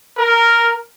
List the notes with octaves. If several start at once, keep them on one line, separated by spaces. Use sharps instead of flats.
A#4